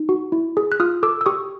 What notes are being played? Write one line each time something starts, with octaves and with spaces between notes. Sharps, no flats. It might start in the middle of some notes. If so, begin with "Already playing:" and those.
Already playing: D#4
F#4
E4
G#4
F#6
F4 D#6 F6
A4 D6 E6
E6
G4 C#6 D#6